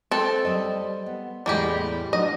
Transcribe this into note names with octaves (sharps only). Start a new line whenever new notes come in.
C4 A4
G3 D#5
B3
E2 A2 G3 G#3 G4
F3 D4 F#4 D#5